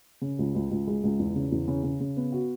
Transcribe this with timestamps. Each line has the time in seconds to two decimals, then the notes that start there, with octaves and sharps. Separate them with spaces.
0.22 C#3
0.39 C#2
0.55 C#2
0.71 C#2
0.87 G#3
1.03 C#2
1.19 E2
1.36 C#3
1.52 E2
1.68 C#3
1.84 C#3
2.00 C#3
2.17 B3
2.32 F#4